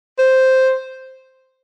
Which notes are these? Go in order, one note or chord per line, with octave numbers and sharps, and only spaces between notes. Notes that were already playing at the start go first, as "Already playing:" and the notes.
C5